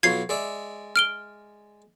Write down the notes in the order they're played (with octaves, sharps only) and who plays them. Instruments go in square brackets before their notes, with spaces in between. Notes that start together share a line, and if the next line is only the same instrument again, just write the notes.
[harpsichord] B1 F#3 F4 [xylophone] G#6 C7
[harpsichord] G#3 D5 E5
[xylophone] F6 D7 G7